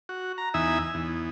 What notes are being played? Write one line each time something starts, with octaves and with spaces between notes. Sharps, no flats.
F#4
A#5
E2 D#4 E5 G#5 E6
E2